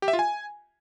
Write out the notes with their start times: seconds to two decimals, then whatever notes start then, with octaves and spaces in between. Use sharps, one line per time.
0.02 G4
0.08 E5
0.13 F4
0.19 G#5